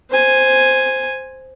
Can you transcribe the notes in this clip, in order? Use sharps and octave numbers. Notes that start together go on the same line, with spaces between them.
C5 G#5